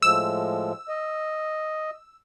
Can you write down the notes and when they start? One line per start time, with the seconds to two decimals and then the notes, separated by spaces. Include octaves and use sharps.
0.02 A2 F3 G#3 E6
0.89 D#5